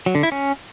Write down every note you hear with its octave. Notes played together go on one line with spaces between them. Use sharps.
F#3
D3
E4
C#4